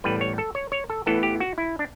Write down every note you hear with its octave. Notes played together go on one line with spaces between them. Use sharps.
A1 A2 G3 B3 B4
C#5
A4
C#5
C#5
A4
A1 A2 E3 B3 A4
G4
F#4
E4
D4